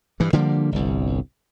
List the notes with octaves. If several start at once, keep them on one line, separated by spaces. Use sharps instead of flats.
G2 E3
D3 F3 G3 A#3
G1 C2